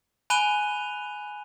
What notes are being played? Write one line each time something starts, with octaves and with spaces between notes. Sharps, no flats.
G#5 B5 F#6 D#7 F7 G7